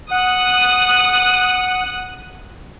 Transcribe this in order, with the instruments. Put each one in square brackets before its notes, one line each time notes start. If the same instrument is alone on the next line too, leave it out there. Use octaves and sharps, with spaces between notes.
[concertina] F#5 [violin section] D#6 F#6